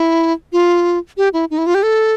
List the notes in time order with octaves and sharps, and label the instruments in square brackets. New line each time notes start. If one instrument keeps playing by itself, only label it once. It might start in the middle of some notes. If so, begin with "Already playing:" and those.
Already playing: [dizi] E4
F4
G4
E4
D#4
E4
F4
G4
A4